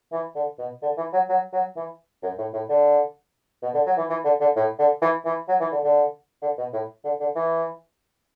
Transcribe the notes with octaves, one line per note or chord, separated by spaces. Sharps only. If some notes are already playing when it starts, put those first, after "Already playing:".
E3
D3
B2
D3
E3
F#3
F#3
F#3
E3
F#2
A2
A2
D3
B2
D3
F#3
E3
E3
D3
D3
A2
D3
E3
E3
F#3
E3
D3
D3
D3
B2
A2
D3
D3
E3